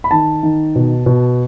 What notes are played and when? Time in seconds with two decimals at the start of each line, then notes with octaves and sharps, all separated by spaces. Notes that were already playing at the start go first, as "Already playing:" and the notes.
0.04 B5
0.11 D#3 A5
0.43 D#3
0.76 B2
1.06 B2